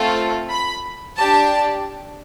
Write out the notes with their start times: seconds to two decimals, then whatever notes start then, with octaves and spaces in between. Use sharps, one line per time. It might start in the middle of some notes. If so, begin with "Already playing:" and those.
Already playing: A3 C4 F4 A4
0.50 B5
1.17 D4 G4 A5